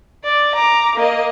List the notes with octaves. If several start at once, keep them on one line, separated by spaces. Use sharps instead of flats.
D5
A#5 D6
A#3 D#5